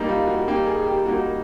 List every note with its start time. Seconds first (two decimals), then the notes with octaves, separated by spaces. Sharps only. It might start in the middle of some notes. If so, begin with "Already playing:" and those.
Already playing: G3 A#3 D#4
0.09 F4
0.27 F#4
0.48 G3 A#3 D#4 G4
0.66 G#4
0.86 G4
1.05 G3 A#3 D#4 F#4